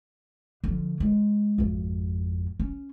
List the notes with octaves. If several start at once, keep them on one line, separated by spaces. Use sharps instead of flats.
D3 F3
G#3
G#1 F2
C#4